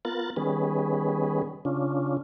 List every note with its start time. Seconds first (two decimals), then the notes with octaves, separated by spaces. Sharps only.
0.05 B3 F4 A#4 F#6 A6
0.36 D#3 G3 B3 C#4 G#4 B4
1.65 C#3 C#4 D4 F4